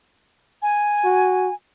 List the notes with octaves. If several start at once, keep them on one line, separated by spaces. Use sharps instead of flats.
G#5
F#4